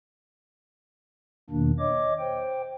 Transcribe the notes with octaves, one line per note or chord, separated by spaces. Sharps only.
E2 B2 D#3 A#3 D4
C#5 D#5 D6
C5 G5